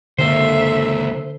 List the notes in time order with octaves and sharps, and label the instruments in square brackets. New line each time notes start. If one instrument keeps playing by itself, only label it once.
[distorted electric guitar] C#2 A#3 [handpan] D3 [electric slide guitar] C5 [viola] E5